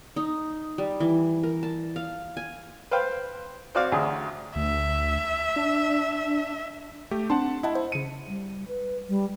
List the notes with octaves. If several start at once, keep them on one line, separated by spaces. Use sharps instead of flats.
D#4
G3
E3
A#4
A5
F5
G#5
B4 C5 F5 G5
C4 F#4 D5 F5
A1 D2 G#4
D2 E5
D4
A3 G4 B6
C4 D4 F#5 A5 C6
E4 D#5 F#5 A5
C5
C#3 C#7 D#7
G3
B4
G3